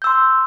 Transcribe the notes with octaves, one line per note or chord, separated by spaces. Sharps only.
C6 E6 G6